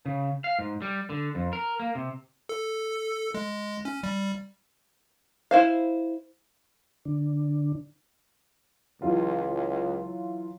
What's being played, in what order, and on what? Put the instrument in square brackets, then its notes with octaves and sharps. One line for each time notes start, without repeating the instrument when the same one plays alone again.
[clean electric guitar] C#3
F5
G#2
G3
D3
F2
A#4
A#3
C3
[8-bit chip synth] A4
G#3
C#4
G3
[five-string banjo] E4 C5 F5
[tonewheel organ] D3 D4
[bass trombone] C#2 [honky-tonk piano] E3 F#3 F4